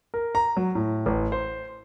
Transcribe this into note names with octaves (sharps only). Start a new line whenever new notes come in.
A#4
A#5
F#3
A2
A1
C5